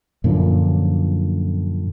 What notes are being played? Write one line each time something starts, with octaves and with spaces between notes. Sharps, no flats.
F#2 A#2 D3 F3